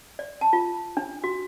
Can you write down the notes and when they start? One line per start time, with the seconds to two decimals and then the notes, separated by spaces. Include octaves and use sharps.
0.19 D5
0.41 A5
0.53 F4
0.97 D4
1.24 F#4